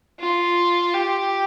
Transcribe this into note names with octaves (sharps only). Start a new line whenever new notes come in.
F4
G4